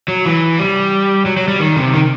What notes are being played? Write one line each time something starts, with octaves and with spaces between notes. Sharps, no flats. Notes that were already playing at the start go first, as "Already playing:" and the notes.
F#3
E3
G3
F#3
F#3
G3
D#3
C3
D#3